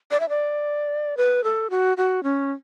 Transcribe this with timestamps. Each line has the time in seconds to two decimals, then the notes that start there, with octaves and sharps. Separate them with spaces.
0.11 D5
0.20 E5
0.29 D5
1.17 B4
1.44 A4
1.70 F#4
1.97 F#4
2.23 C#4